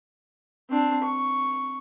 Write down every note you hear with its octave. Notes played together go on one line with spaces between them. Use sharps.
C4 D4
C#6